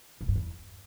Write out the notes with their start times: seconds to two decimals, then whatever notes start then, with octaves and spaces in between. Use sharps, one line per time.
0.21 C#3
0.28 G2
0.36 E2